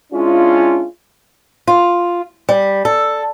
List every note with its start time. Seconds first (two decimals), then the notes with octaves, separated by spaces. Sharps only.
0.13 G#3 C#4 D4 E4 F4
1.67 F4
2.49 G3
2.85 A4